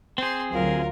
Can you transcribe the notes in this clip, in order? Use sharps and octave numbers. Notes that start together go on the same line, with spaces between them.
C4 G#4 C5 C6
D2 F#3 F4 A#4